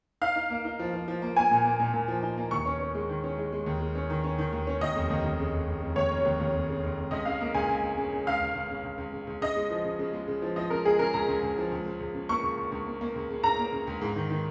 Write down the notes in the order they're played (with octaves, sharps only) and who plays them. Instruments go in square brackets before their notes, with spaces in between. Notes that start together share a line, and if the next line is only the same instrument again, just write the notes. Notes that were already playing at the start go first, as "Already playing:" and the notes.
[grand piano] D#4 [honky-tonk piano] F5
[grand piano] D#4
A#3
D#4
F3
F3
F3
A#3
[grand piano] A#3 [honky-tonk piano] G#5
[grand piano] A#2
A#3
A#2
A#2
F3
D#4
A#3
[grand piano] D#2 [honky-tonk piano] C#6
[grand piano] C#4
C#4
G#3
D#3
C#4
G#3
G#3
D#2
G#3
C#4
D#3
C#4
D#3
D#2
C#4
[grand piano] D#2 [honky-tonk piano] D#5
[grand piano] F1
D#2
D#2
C#3
F1
F1
F1
[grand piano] D#2 [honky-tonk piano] C#5
[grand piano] F1
D#2
D#2
F1
C#3
F1
F1
[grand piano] C#2 [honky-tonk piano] D#5
[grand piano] C#3 [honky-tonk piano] F5
[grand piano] A#3
[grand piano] C#2 [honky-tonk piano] G#5
[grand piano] C#2
C#2
C#3
C#3
[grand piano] C#2 [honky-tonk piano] F5
[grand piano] C#2
C#2
C#3
C#2
C#2
C#3
C#2
[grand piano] C#3 [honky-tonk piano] D#5
[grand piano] G#3
F3
C#3
C#3
G#3
C#3
F3
[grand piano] F3 [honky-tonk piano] D#5
[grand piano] C#3 [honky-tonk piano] A#4
[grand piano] G#3 [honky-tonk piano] G#4
[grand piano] C#3 [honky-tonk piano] A#4
[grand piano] C#2 [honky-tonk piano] A#5
[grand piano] C#2
C#2
F3
C#2
C#3
C#2
C#3
[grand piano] A#3 [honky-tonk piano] C#6
[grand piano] C#2
C#2
C#2
A#3
A#3
C#2
C#3
[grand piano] C#3 [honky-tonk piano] A#5
[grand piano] A#3
C#3
C#2
G#2
D#3
D#3